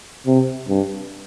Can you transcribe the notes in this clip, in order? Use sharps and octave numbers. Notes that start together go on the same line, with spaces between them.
C3
G2